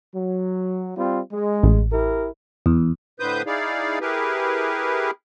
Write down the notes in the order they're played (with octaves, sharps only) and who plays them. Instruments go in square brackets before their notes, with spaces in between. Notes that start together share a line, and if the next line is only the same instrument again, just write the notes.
[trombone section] F#3
G3 C4 F4
G#3
[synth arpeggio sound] A1
[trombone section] E4 G4 A#4
[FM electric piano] E2
[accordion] A2 D3 B4 C5 D#6 G6
D#4 E4 G#4 D5 F5
E4 G4 G#4 A#4 B4